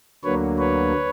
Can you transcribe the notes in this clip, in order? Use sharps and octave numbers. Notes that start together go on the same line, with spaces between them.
D2 D3 F#3 A#3 B4 C#5
B4 C#5